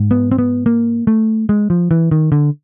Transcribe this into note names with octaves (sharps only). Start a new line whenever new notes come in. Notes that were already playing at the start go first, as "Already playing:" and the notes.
Already playing: G#2
B3
C4
B3
A#3
A3
G#3
F3
E3
D#3
D3